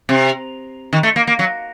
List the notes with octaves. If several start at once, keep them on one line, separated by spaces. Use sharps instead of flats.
C3
D#3
A3
A#3
A#3
F#3